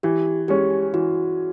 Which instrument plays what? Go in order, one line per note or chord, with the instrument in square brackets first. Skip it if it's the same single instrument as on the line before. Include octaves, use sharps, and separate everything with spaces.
[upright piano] E3 [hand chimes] G4
[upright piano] G#3 C#4 [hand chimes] G4
[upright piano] E3 [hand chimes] F#4